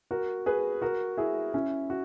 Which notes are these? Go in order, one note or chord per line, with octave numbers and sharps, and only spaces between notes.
F#4 A#4
G#4 B4
F#4 A#4
E4 G#4
C#4 E4
F#4